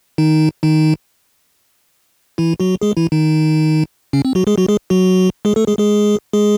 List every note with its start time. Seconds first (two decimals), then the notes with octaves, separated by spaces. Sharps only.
0.18 D#3 D#4
0.63 D#3 D#4
2.38 E3 E4
2.60 F#3 F#4
2.82 G#3 G#4
2.97 E3 E4
3.12 D#3 D#4
4.13 C#3 C#4
4.25 C4
4.35 F#3 F#4
4.47 G#3 G#4
4.58 F#3 F#4
4.68 G#3 G#4
4.90 F#3 F#4
5.45 G#3 G#4
5.56 A3 A4
5.67 G#3 G#4
5.78 G#3 G#4
6.33 G#3 G#4